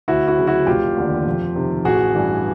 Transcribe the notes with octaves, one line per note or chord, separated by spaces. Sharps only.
D2 E4 F#4
E4 F#4
C#3 F#3
E4 F#4
F1 F4 G4
D#2 D3
F2
C3 D#3
A1 F#4 G#4
G2 E3 G3